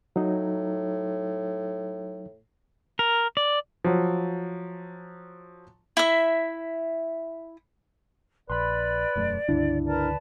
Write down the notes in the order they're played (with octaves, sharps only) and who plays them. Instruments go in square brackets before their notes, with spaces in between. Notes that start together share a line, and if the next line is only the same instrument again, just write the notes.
[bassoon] A2 [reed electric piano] F#3 D#4
[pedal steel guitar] A#4
D5
[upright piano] F3 F#3
[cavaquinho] E4 E5
[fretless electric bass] A#1 [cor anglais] B4 [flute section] D5 [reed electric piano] B5 C6
[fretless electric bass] E1 F#2 A3
[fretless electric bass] C#2 D3 [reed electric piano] G2 D4 E4
[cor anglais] A#4 [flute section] B4 D5 A5